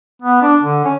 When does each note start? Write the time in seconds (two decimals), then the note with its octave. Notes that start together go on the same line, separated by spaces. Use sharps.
0.22 B3
0.42 D4
0.63 D3
0.85 C#4